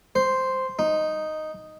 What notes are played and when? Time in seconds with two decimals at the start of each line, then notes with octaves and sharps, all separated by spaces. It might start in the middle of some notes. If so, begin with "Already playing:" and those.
0.15 C5
0.79 D#4